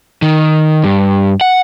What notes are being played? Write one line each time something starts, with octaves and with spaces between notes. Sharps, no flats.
D#3
G2
F#5